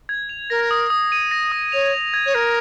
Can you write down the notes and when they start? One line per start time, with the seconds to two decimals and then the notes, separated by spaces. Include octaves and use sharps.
0.09 G#6
0.29 F7
0.50 A#4 A#6
0.71 D#6
0.90 D#6
1.12 D#7
1.31 A#6
1.52 D#6
1.72 C#5 F7
1.94 F7
2.14 G#6
2.26 C#5
2.34 A#4 G#6